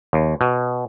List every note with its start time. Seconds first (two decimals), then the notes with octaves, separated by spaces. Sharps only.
0.13 D#2
0.41 B2